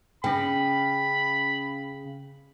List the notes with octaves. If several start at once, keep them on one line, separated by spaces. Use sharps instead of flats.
C#3 C#4 G5 B5